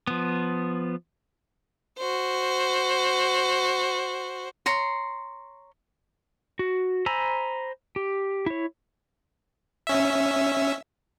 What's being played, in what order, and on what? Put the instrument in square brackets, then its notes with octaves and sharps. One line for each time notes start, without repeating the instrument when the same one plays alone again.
[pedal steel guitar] F3 B3
[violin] F#4 C5
[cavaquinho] C#5 A#5 C6
[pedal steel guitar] F#4
C5 G#5 A#5 B5 E6
G4
E4 C#5
[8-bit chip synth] C#4 E5